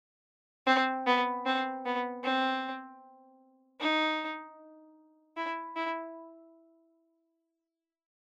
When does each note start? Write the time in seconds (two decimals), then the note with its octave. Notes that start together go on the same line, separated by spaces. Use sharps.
0.67 C4
1.07 B3
1.46 C4
1.85 B3
2.24 C4
3.80 D#4
5.37 E4
5.76 E4